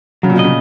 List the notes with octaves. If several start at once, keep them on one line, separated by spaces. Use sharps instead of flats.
C#3 F#3
A#2
B2
C#3 D#5